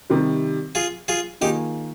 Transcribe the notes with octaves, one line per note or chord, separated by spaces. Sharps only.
C3 D#3 G3
F4 G#4
F4 G#4
D#3 A#3 D#4 F4 G4 G#4